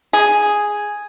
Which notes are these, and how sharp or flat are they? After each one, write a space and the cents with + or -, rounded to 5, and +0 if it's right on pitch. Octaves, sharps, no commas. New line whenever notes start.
G#4 +0